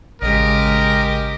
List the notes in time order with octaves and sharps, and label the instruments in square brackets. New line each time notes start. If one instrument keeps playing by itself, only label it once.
[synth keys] A1 [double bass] C#3 G#3 [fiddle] G4 D#5 [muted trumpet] A#4